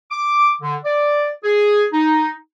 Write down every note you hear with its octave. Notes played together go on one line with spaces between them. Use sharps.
D6
D3
D5
G#4
D#4